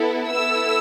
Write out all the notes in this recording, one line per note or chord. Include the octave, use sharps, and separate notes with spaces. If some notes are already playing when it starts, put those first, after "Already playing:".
Already playing: B3 E4 A4
B3 E4 A4 E6